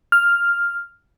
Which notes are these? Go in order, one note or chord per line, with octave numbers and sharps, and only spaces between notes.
F6